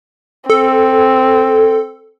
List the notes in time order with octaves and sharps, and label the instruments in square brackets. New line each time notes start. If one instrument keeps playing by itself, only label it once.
[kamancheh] C4 [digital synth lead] A4